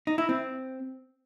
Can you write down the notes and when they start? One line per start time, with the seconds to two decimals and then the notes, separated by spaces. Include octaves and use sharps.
0.07 D#4
0.18 E4
0.29 C4